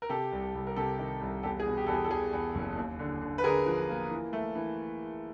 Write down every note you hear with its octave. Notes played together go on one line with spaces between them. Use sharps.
A#4
C3 G4 A4
C2
C2
A#4
C3 G4 A4
D#3
C2
E2 G4 A4
G#4
B2
G4
E2 A4
G#4
A4
E2 G#4
E2
F#1
D#2
D3
D3
B4
D3 G#4 A#4
F3
A#3
E3
A3
E3